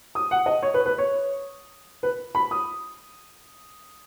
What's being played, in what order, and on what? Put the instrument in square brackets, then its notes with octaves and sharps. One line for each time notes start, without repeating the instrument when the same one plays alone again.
[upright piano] D#6
F#5
D#5
C#5
B4
B4
C#5
B4
B5
D#6